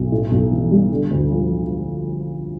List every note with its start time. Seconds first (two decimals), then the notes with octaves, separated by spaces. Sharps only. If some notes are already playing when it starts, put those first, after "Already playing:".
Already playing: B1
0.12 A2
0.31 B1
0.52 E3
0.71 G3
0.91 D3
1.11 D2
1.31 F3